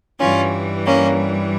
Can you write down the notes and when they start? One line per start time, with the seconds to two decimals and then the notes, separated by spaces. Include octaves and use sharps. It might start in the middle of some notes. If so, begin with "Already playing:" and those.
0.19 G2 E3 G3 C#4 F4
0.86 A#3 C#4